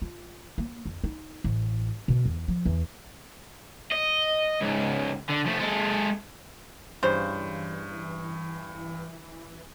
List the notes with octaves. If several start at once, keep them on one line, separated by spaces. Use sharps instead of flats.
F4
A#3
F2
D#4
A1
B2
E2
F3
E2
D#5
C#2 G#2
D3
F3 A3
G#3 A4
G2 C#3 E3 C5